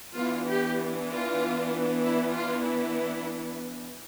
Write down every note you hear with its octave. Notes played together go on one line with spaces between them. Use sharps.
E3 B3 D4 F4
G4
F4
E4
F4
E4